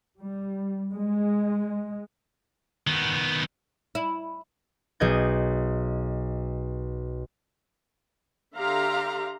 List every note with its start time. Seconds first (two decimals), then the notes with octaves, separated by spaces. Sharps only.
0.19 G3
0.93 G#3
2.87 D#3 B3
3.95 E4
5.00 B1 G#4 D#5 G6 G#6
8.56 D3 G4 E5 F5 A#5 C6